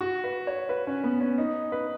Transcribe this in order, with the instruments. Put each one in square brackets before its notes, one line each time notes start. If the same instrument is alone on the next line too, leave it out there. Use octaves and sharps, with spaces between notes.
[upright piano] F#4
B4
C#5
B4
C#4
B3
C#4
D#4
B4